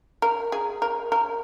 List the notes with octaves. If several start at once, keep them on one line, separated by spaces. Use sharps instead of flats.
A#4
G#4
A#4
A#4